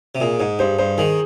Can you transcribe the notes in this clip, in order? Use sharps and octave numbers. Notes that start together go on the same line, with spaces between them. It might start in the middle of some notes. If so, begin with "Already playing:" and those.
C3
A#2 G#4
G#2 G#4
G2 C5
G2 C5
D#3 G#4